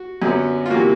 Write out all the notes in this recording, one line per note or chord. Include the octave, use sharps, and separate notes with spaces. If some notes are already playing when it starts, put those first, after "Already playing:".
Already playing: F#4
F#2 D3 F#3 B3
F4
C3 E3 G3 A#3 F#4